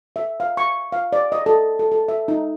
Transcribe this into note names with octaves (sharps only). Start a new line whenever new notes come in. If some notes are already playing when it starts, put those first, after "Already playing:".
E5
F5
C#6
F5
D5
D#5
A4
A4
A4
E5
D#4